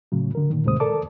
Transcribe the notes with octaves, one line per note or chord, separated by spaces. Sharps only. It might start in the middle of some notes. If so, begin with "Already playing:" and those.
A2 C#3 F#3
D3 A#4
A#2 D#3
D#2 A2 C3 G#3 C5 D#6
A4 A#4 D5 A5 D6